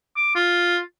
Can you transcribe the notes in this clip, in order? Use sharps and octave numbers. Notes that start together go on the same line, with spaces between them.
D6
F4